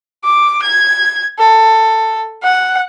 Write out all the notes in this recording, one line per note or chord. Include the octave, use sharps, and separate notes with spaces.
D6
G#6
A4
F#5